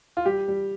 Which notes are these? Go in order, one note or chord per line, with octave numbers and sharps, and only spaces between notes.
F4
G3 G4
G3